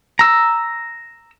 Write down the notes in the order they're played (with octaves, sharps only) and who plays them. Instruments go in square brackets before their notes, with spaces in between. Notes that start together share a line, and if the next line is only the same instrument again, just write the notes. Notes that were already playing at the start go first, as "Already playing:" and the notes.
[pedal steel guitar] A#5 E6